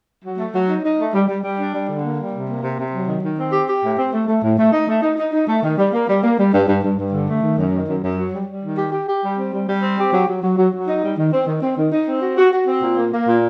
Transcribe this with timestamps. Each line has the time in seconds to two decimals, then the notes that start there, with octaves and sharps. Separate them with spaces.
0.24 F#3
0.38 A3
0.53 F#3
0.68 D#4
0.83 D#4
0.98 A3
1.14 G3
1.28 G3
1.43 G3
1.58 D4
1.73 G3
1.88 D3
2.03 A#3
2.18 G3
2.33 C3
2.48 A#3
2.63 C3
2.78 C3
2.93 F#3
3.08 D#3
3.22 D#3
3.38 C4
3.52 G4
3.68 G4
3.83 A2
3.98 C4
4.13 A3
4.27 A3
4.42 A2
4.58 A3
4.72 D#4
4.88 A3
5.02 D#4
5.18 D#4
5.33 D#4
5.47 A3
5.63 D#3
5.78 G3
5.93 A#3
6.08 G3
6.23 A#3
6.38 G3
6.53 G2
6.68 G2
6.83 G2
6.97 G2
7.13 D3
7.28 A3
7.43 D#3
7.57 F#2
7.73 D#3
7.88 F#2
8.03 F#2
8.17 F#3
8.32 G3
8.47 G3
8.63 D#3
8.77 G4
8.92 G4
9.08 G4
9.23 G3
9.38 C4
9.52 G3
9.67 G3
9.82 C4
9.97 G4
10.13 F#3
10.27 F#3
10.42 F#3
10.57 F#3
10.72 F#3
10.88 D#4
11.02 G3
11.17 D#3
11.32 C4
11.47 D#3
11.62 C4
11.77 D#3
11.92 D#4
12.07 C4
12.22 F#4
12.38 F#4
12.52 F#4
12.67 C4
12.82 A#2
12.97 A#3
13.13 A#3
13.27 A#2